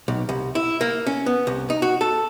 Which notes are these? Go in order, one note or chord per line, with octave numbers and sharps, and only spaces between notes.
B1
C2
E4
A#3
C#4
B3
C2
D#4
F#4
A4